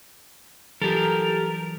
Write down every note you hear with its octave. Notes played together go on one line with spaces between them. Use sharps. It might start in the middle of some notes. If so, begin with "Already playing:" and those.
E3 F#3 G3 G4 A4 A#4